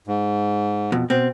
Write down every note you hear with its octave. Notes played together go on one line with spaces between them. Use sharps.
G#2
F2 B2
B2 C4